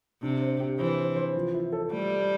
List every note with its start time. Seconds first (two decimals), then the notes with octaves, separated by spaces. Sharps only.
0.23 C3 D4
0.41 C5
0.60 G4
0.79 E3 C5
0.98 C5
1.16 C5
1.35 F3
1.54 E4
1.73 A4
1.91 G3 A3
2.10 A3